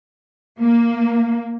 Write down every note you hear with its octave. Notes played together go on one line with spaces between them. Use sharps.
A#3